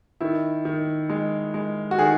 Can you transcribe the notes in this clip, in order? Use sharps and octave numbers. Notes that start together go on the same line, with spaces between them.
D#3 E4
D#3
G#3
G#3
F#4
D#3 G#4